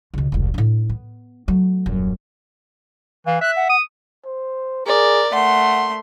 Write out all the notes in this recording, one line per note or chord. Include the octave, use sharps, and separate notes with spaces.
C#2 B2
E1 C2
A2 D4
B3
F#3 A3
D#1 F#2
E3 F5
E5 F#6
F#5
D#6
C5
G#4 A#4 D5
A3 F#5 C6